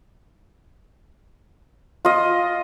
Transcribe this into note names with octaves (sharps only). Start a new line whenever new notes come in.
F4 D#5